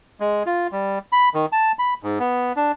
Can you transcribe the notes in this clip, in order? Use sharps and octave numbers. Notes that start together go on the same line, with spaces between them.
G#3
F4
G3
B5
D#3
A5
B5
G#2
B3
D4